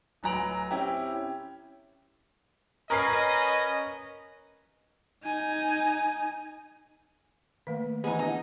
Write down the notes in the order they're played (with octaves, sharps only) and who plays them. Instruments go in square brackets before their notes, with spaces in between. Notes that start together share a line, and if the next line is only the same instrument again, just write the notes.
[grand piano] D1 F#3 B4 A#5 D7 F#7
C4 C#4 E4 G4
[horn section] C#4 B4 D#5 [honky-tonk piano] A#4 C7
[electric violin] D#4 G#5
[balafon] D#3 A3 A#3 [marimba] B4
[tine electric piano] E3 B3 [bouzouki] D#4 G#4 [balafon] D#5 [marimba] F#5 B5
[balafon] D4 A5 [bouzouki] D#4